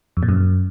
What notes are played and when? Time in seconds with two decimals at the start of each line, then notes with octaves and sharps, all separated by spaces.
0.17 F2
0.23 A#2
0.29 F#2